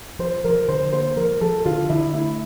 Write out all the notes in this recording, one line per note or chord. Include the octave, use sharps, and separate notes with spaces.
F3 C5
F3 A#4
D3 C5
A#3 C5
F3 A#4
F3 A4
D3 F4
D3 E4
A3 E4